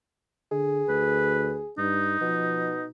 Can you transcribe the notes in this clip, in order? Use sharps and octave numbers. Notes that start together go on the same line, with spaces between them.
D3 G#4
D2 B4
G2 D#4
B2 F3